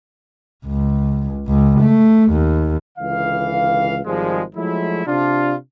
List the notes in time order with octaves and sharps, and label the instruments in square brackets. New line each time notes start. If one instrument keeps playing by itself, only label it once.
[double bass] C#2
C#2
A3
D#2
[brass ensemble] C#2 D3 E3 F5
G#1 F3 G3 G#3
F3 F#3 G#3 A3 E4
C3 D4 F4